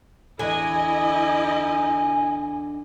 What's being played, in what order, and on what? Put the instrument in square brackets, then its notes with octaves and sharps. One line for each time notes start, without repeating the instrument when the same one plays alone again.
[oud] E2 D3 [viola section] E4 D#5 [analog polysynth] G#5